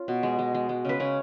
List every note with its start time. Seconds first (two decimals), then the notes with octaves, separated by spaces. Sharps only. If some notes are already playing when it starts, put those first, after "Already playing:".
Already playing: C#4 F4
0.08 B2
0.23 G#3
0.39 G#3
0.54 G#3
0.69 G#3
0.85 C#3 B4
1.00 C#3 C#5